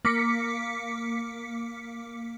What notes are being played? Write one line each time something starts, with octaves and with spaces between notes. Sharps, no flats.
A#3 D6 B6 C#7